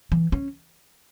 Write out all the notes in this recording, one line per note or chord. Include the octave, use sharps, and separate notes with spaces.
E3
C#4